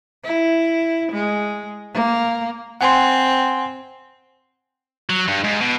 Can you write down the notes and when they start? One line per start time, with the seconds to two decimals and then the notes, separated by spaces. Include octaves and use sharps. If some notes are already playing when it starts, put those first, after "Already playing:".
0.24 E4
1.12 G#3
1.94 A#3
2.81 C4 F#5 G#5 C6
5.10 F#3
5.28 G2
5.44 G#2
5.61 B2